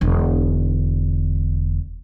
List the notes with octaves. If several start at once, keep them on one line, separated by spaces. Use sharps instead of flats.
E1 D3